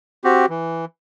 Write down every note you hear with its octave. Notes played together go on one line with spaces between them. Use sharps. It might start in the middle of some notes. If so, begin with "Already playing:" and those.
C4 F#4 G4
E3